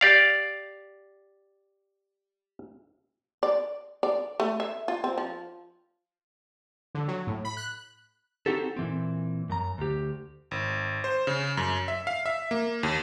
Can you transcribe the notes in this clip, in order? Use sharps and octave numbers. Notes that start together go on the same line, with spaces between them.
G4 D5 F5
D5
D5
A3
E5
F4
C4
F3
D3
F#3
A2
B5
F#6
C4 D#4 F#4 G4 A4
A#2 E3 C4
F#2 A#5
D2 G4
G#1
C5
C#3
F#2
E5
F5
E5
A#3
D#2